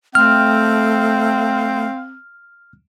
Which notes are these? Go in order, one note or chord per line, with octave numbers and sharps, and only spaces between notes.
A3 C4 F5 G5 F6